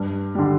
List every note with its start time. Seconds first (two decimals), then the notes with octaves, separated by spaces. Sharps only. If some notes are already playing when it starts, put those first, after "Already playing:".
Already playing: G2
0.35 D3 G3